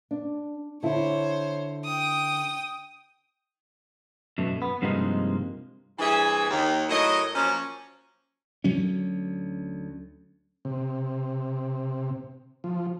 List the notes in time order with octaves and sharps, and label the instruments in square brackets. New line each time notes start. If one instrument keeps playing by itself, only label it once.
[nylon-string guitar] D4
[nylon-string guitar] D3 E4 [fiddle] C5 C#5
[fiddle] G5 D#6
[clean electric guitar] F#2 B2 A3
B3
G2 C3 F3 G#3 A#3 D#4
[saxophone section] G2 C3 E3 G#4 E5
D#2
A2 F#3 A#4 D#5
F3 F#3 A#3 C#4
[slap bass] D2 F#3 C#4
[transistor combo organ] C3
F3